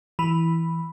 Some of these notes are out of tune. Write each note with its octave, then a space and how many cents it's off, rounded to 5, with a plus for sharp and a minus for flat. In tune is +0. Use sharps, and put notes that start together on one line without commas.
E3 +0 B5 +0